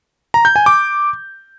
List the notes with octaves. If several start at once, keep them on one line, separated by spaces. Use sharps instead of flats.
A#5
G6
G#5
D6